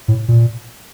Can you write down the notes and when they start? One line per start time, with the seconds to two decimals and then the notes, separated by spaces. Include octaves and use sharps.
0.08 A2
0.28 A#2